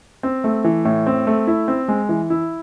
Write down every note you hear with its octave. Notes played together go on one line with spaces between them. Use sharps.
C4
A3
E3
A2
C4
A3
E4
C4
G#3
E3
E4